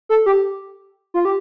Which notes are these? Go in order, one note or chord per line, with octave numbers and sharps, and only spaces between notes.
A4
G4
F4
G4